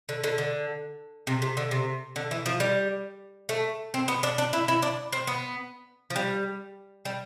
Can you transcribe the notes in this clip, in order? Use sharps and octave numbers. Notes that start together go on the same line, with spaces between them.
D3
D3
D3
C3
C3
D3
C3
D3
E3
F3
G3
A3
C4
B3
D4
D4
E4
E4
D4
C4
B3
F3
G3
G3